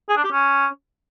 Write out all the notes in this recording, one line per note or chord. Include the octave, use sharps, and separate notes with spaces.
G#4
D4
G4
C#4